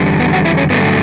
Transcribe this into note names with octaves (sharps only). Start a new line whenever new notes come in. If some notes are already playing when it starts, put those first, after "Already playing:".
Already playing: E2 D3 G3
B3
F#4
E4
C#4
G2 D3 F#3 A3 B3